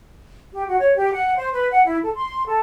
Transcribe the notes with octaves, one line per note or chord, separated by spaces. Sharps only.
G4
F#4
C#5
G4
F#5
C5
B4
F#5
E4
A4
C6
A4